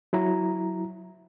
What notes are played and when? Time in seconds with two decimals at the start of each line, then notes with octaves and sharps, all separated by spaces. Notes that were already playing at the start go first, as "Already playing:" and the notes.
0.13 F#3 E4 A#5